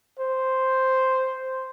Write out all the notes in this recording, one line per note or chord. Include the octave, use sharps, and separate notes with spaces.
C5